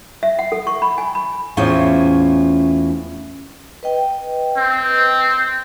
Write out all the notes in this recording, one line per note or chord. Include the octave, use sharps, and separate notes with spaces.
E5
F#5
A4
C#6
B5
G#5
B5
E2 A2 C#4 E4 F4 C5
B4 D#5 G5
C4